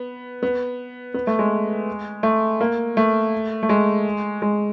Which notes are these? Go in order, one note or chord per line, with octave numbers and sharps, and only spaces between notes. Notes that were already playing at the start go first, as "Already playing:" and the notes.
Already playing: B3
B3
B3
A3
G#3
A3
A#3
A3
A3
G#3
G#3